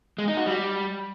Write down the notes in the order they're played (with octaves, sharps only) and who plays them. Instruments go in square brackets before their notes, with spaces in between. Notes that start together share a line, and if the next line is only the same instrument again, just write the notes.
[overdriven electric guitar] G#3
D#4
F#4
G3